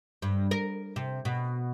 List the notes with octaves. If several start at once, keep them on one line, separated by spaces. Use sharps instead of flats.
G2
A#4
C3
B2